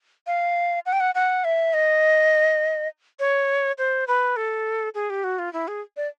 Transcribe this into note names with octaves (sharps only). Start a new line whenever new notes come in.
F5
F#5
G5
F#5
F#5
E5
D#5
C#5
C5
B4
A4
G#4
G4
F#4
F4
E4
G#4
D5